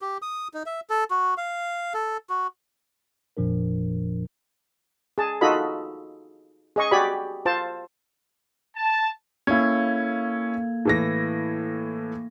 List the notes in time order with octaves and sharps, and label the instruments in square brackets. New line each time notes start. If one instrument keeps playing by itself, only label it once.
[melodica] G4
D#6
D#4
E5
A4
F#4
F5
A4
F#4
[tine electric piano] G1 F2 A#2 F3 D4 A#4
[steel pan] G#4 A5
D#4 F4 F#4 A4 D#5 B5
G#4 D#5 C#6
F#4 G4 D5 G#5 B5
F4 C5 A5
[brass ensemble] A5
[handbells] A#3 A4 G#6 [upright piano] C#4 E4
[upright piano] A2 E3 A#6